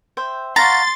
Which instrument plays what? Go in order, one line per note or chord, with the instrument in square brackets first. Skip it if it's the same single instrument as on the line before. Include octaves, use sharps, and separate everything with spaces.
[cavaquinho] C5 E5 G5
[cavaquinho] C#5 F5 F#5 [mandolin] A#5 [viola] C6 [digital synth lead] A6